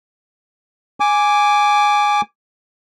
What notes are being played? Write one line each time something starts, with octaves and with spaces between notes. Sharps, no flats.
G#5 D6